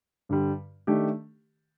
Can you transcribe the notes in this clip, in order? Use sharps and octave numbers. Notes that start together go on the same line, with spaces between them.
G2 D3 G3
D#3 A3 D4 G4